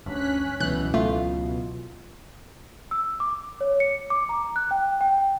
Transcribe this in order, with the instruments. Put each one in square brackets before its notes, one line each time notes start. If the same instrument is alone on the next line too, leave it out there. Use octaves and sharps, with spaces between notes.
[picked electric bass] D2 G2 [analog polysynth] C#4 F#6 B6
[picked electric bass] C#2 F#3 C#4 [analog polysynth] B2 [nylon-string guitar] E3 [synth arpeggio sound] F#6
[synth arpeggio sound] A3 [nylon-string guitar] F4
[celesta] E6
D6
C#5
C#7
D6
A#5
F#6
G5
G5